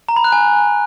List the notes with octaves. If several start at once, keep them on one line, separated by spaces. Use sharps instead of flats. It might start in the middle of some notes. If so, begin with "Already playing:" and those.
A#5
B5
F#6
G#5